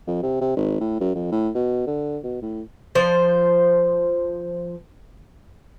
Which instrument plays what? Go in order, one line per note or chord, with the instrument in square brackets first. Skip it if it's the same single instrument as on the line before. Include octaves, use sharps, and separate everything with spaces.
[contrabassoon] F2
C3
C3
G#1
A2
F#2
F2
A2
B2
D3
B2
A2
[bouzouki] F3 C5